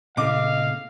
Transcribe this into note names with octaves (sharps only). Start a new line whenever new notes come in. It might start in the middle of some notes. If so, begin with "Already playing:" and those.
A#2 C#3 A3 D#5 F5 D6